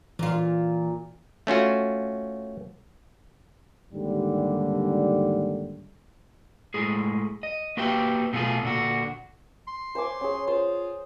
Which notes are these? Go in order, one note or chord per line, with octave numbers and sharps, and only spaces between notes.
A#2 E3 F4
A3 C#4 F4 F#4
D#2 G#2 D3 G3
A2 G#3 G#4
D#5
A#3 F#4 G4 B4 E5 G5
B2 A3 F4 G#4
A#2 D3 F#4
C6
C5 G#5 D6
C#4 G#4
F4 C5